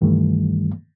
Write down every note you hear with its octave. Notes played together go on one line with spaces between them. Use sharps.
C2 G2 D#3 E3 G3 A3